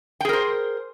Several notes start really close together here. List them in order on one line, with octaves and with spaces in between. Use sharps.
G5 G#4 A#4 C5